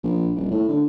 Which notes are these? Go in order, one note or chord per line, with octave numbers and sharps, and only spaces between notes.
A#1
D#1
A2
D3